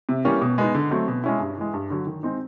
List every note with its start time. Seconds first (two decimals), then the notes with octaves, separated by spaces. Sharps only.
0.09 C3
0.25 E3 G3 A#3 C#4
0.41 B2
0.58 G#3 B3 D#4
0.75 D3
0.91 F#3 A3 C4
1.08 B2
1.24 G#3 C#4 E4
1.40 G2
1.57 E3 G#3
1.74 G2
1.90 D3 F#3
2.07 D#3
2.23 G#3 C4 D#4